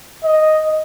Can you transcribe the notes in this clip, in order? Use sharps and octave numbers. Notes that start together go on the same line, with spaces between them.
D#5